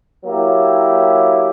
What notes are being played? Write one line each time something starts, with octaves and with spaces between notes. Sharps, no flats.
F#3 A#3 E4 G4